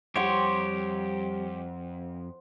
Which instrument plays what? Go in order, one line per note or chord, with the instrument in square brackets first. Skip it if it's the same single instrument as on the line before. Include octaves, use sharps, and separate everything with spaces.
[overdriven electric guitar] F2 [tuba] G3 [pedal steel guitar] G4 C#5 [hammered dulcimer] C5 F#5